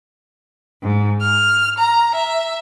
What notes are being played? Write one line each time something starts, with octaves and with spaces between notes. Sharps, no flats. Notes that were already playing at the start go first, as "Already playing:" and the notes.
G#2
F6
A#5
E5